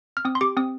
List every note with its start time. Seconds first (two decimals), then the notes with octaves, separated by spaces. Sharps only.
0.17 F6
0.25 C4 D#6
0.35 C6
0.41 G4 D6
0.57 C4 D#6